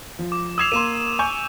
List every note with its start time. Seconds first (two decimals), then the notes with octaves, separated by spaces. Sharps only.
0.19 F3
0.32 D6
0.58 D#6 E6 G#6 C7 E7 F7
0.72 A#3 C6 D#7 E7
1.19 G#5 C#6 G6